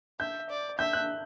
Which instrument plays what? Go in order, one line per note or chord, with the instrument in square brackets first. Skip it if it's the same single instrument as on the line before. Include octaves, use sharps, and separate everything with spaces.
[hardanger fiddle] E5 [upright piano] G6
[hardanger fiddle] D5
[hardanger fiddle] E5 [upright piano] G6
[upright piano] F#6